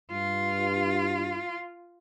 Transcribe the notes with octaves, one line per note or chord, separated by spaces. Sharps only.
G2 F4